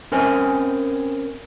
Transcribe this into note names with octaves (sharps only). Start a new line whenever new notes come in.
C4 C#4 A#4 C5 G#5